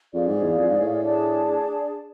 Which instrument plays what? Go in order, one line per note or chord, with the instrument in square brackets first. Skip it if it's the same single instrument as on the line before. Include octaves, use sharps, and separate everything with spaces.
[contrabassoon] F2 [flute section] G#4 D5 F5
[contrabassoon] G#2
E2
F2
G#2
A2
[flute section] D4 G#4 D5 A5